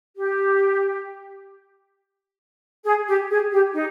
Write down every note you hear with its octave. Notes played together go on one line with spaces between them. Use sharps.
G4
G#4
G4
G#4
G4
D#4